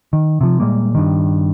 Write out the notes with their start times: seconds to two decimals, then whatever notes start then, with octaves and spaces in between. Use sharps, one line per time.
0.13 D#3
0.41 C3 F3
0.60 A#2 G3 G#3 A#3
0.95 G2 D#3